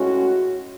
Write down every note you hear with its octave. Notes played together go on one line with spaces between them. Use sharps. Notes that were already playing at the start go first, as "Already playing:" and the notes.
Already playing: A2 G#3 C#4 F#4